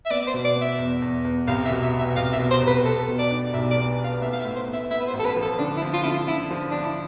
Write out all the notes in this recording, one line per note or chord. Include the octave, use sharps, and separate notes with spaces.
E5
B3 D5
C5
B2
D5
B3
E5
E2
E2
E2
C2 F5
E5
B2
E5
B2
E5
C2 F5
E5
B2
C5
C2
B4
B3 A4
B2
D5
D4
B1 E5
D5
B3
B3
F5
B3 E5
F5
E5
A2
C5
B3
E5
B3 E5
B4
C5
A1
A4
B4
F3
A4
D3 D4
E4
F3
F4
D3 E4
F4
D3 E4
F3
F3 D4
E4